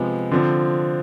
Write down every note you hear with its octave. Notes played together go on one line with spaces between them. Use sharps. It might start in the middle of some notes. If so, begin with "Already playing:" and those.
Already playing: C3 F3 G#3 B3
D3 F3 C4